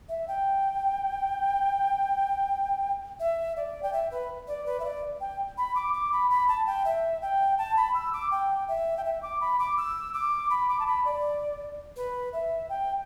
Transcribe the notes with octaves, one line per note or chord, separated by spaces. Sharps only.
E5
G5
E5
D5
G5
E5
B4
D5
B4
E5
D5
G5
B5
D6
D6
B5
B5
A5
G5
E5
G5
A5
B5
E6
D6
G5
E5
G5
E5
D6
B5
D6
E6
D6
B5
D6
A5
B5
D5
B4
E5
G5